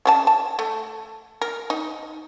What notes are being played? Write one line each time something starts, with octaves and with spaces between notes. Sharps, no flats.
C#3 C4 A5
A5
A3
A#4
D#4